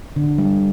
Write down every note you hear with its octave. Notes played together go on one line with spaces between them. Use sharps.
D3
G3